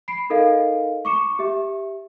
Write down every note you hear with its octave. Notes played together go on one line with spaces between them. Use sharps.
B5 C7 D7
D#4 A4 A#4 D#5 F5
C#6 D6 C#7 E7
G4 E5